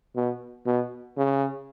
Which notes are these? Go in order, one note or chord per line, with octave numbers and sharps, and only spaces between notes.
B2
B2
C#3